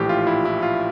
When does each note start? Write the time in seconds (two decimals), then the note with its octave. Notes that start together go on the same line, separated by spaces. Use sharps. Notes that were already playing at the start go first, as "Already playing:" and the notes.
Already playing: A#1 A2 E3 G4
0.09 F4
0.27 E4
0.45 E4
0.63 F4